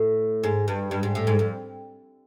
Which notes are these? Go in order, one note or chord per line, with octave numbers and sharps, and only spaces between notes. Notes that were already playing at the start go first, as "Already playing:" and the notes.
Already playing: A2
G#2
G2
G2
G#2
A2
G#2
F2